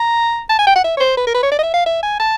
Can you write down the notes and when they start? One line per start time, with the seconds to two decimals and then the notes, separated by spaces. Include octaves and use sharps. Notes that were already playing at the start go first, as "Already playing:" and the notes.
Already playing: A#5
0.50 A5
0.59 G#5
0.67 G5
0.75 F#5
0.84 E5
0.97 C#5
1.00 C5
1.17 B4
1.27 A#4
1.34 B4
1.43 C#5
1.51 D5
1.59 D#5
1.63 E5
1.74 F5
1.86 E5
2.03 G#5
2.20 A5